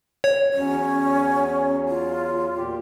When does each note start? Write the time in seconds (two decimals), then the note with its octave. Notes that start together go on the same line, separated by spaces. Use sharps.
0.24 C#5
0.53 E2 F#3 C#4
1.88 F4
2.56 A#2 G4